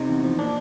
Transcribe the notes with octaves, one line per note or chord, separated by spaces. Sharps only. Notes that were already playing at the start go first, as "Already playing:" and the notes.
Already playing: C3 D#4
E2
F3
A#2 D4